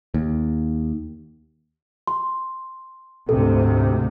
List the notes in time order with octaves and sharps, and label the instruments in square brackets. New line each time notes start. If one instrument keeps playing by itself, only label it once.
[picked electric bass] D#2
[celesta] C6
[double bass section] D2 G#2 C3 [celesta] A4